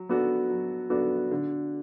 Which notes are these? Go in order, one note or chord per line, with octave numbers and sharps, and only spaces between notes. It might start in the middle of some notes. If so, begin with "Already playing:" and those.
Already playing: F#3
B3 D4 F#4 A4
F#3
B3 D4 F#4 A4
D3